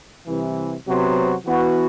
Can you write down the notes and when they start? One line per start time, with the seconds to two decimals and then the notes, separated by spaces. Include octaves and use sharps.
0.27 C2 C3 E3
0.86 C3 F#3 B3 F#4 C5
1.46 E3 B3 F#4